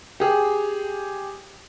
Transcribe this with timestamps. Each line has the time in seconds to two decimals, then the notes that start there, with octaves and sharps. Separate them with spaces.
0.20 G4 G#4